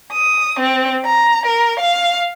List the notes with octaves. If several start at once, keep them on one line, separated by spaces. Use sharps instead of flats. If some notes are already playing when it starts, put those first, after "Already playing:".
D#6
C4
A#5
A#4
F5